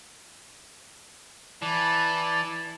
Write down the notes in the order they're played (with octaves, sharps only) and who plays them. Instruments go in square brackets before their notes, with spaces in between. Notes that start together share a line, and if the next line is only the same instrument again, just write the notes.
[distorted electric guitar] E3 [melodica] D5 A5 [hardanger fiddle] G#5 B5